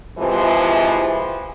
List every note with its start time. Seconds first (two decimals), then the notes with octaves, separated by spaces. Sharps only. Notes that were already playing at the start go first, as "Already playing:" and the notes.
0.18 C3 E3 F3 G#3